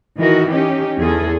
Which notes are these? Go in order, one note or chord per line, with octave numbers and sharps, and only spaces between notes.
D#3 E3 D#4 F#4 A#4
C#4 D#4 G4
E2 G#4 A4